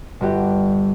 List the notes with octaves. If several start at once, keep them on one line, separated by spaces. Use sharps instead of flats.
G1 F#4 G4